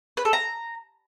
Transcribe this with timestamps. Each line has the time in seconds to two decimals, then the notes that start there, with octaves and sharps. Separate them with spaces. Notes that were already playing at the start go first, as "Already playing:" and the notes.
0.17 B4
0.25 A4
0.33 A#5